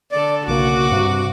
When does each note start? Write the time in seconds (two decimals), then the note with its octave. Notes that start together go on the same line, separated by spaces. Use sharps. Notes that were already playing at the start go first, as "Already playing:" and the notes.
0.12 D3 A4 D5
0.48 B1 C#3 A#3 F#4 D6
0.92 G2 C3